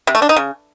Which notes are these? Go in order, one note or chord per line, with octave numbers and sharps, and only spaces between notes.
C3
A3
D4
D#4
C#3